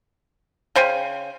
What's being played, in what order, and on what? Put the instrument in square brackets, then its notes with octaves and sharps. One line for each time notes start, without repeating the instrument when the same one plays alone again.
[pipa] C#3 C5 G5 G#5